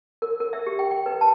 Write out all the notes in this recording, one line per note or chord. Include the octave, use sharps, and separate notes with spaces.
A#4
A#4
E5
G4
G5
G5
B4
A5